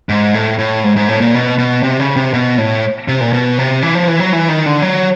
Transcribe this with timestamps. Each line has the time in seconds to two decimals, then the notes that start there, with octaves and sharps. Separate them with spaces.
0.09 G#2
0.34 A2
0.59 A2
0.84 G#2
0.96 G#2
1.09 A2
1.21 A#2
1.34 B2
1.58 B2
1.83 C3
2.00 C#3
2.16 C3
2.34 B2
2.58 A2
3.08 C3
3.21 A#2
3.33 B2
3.58 C3
3.82 E3
3.95 F3
4.08 E3
4.20 F#3
4.33 E3
4.49 D#3
4.66 D3
4.82 F#3